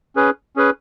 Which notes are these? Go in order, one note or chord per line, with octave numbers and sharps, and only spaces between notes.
C#4 G#4 B4
C#4 G#4 B4